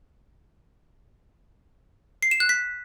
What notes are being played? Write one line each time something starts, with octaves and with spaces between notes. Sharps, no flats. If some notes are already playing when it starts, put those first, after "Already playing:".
C7
E7
F#6
B6